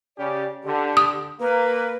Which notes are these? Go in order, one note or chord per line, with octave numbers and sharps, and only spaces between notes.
C#3 C#4 G4 D5
D3 G4
D#6
A#3 B4